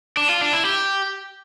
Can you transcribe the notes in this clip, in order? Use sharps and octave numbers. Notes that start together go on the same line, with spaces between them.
D4
F4
D4
E4
G4